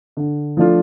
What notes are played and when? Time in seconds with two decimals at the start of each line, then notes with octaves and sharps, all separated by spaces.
0.17 D3
0.57 F3 A3 D4 F4